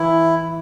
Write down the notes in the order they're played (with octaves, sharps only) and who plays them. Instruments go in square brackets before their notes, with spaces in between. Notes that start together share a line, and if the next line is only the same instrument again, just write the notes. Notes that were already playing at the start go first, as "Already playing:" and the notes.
Already playing: [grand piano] E3 [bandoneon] E4